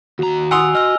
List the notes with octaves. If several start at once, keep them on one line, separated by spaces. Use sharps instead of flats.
D#2 F#4 A#5
F#5 G#5 C6 D#6 E6 F7
D#5 E6 F6